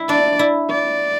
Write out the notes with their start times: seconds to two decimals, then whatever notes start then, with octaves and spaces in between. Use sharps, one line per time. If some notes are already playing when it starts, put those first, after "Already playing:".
Already playing: E4
0.09 D4 D5
0.39 E4
0.71 D5